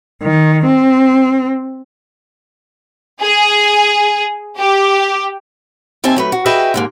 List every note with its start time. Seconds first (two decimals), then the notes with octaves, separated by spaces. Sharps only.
0.21 D#3
0.64 C4
3.22 G#4
4.58 G4
6.04 D#2 C4 D#4 E5 G#5 A5
6.16 F#3 A3 B4
6.32 F#4
6.46 F#4 G#4 B4 D#5 E5 G5
6.74 D#2 G#2 A#3